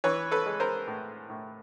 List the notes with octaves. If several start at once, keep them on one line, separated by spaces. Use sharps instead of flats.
E3 B4 C#5
A4 B4
G#3
A#4 C5
A2
A2